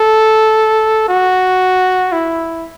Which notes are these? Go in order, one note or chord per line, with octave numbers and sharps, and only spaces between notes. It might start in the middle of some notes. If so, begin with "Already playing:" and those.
Already playing: A4
F#4
E4